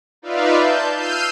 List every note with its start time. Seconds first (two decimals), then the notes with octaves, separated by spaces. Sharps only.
0.22 D#4 F4 B4 D5 E5 F5
0.57 A5 G6
0.95 E6 F6 G6 C7 D#7